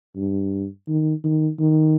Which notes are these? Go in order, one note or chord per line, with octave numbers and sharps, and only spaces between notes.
G2
D#3
D#3
D#3